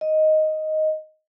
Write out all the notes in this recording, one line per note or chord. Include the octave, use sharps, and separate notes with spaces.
D#5